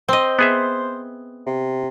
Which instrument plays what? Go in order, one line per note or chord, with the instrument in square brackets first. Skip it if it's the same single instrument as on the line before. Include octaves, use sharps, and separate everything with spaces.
[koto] C4 D#5 [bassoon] C5
[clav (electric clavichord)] B3 G#4 E5
[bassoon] C3